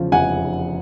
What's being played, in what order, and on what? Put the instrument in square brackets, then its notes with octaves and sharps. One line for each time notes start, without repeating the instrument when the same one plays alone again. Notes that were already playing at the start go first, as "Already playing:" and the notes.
Already playing: [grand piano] E2 C#3 F3
F1 F#5 G#5